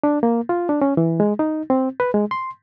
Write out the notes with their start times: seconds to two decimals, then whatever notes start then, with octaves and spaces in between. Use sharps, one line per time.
0.03 D4
0.23 A#3
0.49 F4
0.69 D4
0.82 C#4
0.97 E3
1.20 G#3
1.39 D#4
1.70 C4
2.00 B4
2.14 G#3
2.31 C6